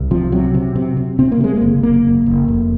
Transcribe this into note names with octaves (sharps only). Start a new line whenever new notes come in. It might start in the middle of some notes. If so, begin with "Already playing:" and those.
Already playing: C2
C3 F3
C3 F#3
C3
C3
C3
C3 C4
A#3
C3 G#3
A#3
F#1
F#1 A#3
F#1
F#1
F1